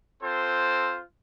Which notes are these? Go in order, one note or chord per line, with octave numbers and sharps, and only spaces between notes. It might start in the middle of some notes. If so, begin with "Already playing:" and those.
C4 F4 A4 C5